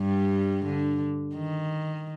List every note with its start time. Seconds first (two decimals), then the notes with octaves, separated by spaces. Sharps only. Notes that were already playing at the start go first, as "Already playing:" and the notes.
Already playing: G2 G3
0.65 D3
1.36 D#3